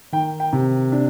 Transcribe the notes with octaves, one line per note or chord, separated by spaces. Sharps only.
D#3 G5
G5
C3
D4